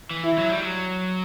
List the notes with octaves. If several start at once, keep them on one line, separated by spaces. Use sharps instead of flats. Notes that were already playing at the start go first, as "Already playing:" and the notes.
E3
E4
F#3
G3
F#3